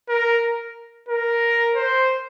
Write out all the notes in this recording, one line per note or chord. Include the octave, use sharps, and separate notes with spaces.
A#4
A#4
C5